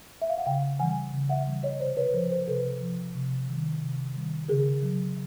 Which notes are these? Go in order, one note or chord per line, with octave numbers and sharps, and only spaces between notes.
E5
F5
F#5
C#3 F5 G5
E3 G3 F#5 G#5
C#3
E5 F#5
E3 G3
C#5 D#5
C3 C5 D5
B4 C#5
F3 A#4 C5
A#4 C5
C3 A4 B4
F3
C3
D#3 G3
C3
D#3 G3
C#3 G#4 A#4
F#3